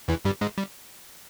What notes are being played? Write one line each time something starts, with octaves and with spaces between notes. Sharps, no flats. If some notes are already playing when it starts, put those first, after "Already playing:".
E2 E3
G2 G3
G#2 G#3
G3